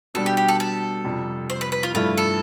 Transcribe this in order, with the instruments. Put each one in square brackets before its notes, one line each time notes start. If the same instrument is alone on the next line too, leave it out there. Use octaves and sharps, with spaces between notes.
[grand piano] B2 G3 D4 [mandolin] A4
[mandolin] G4
G4
A4
A4
[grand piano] F2 C3 G3
[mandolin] C5
B4
B4
F4
[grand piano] G2 F3 A3 E4 [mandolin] F4
[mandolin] A4